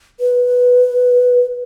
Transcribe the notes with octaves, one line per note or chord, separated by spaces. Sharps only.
B4